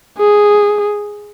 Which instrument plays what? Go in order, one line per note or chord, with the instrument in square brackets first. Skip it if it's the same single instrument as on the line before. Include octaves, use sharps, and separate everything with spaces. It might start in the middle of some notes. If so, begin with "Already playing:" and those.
[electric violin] G#4